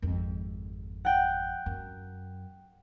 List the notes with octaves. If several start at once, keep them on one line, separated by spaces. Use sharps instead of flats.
G#1 F2
F#5 G5
F#2